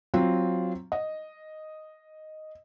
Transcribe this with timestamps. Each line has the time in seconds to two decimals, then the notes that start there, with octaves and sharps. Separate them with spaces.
0.14 F#3 C4 F4
0.92 D#5